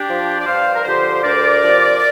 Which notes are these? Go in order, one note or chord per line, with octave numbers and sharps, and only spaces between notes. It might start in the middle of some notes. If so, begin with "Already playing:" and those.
Already playing: D4 G4
F3
D5
G2 C5 F5
A#4
D3 F3 G4 C5
D2 A#4 D5
C3 F3